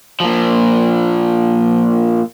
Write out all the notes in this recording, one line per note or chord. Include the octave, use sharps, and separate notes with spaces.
A#2 F3